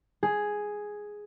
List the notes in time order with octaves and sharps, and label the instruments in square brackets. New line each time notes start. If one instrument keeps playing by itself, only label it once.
[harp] G#4